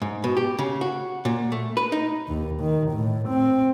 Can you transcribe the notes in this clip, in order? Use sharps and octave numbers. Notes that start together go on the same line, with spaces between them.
G#2
B2
G4
C#3
F#4
A#2
A3
B4
D#4
D#2
D#3
A2
C4